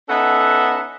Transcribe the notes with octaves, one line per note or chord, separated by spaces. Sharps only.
B3 C#4 D#4 A4 E5 F#5